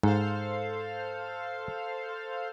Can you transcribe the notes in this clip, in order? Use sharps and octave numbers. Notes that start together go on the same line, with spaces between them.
G#2 A4 C5 F5